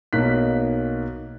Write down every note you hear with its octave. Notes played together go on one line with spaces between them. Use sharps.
B1 A#3 D#4 F#6 B6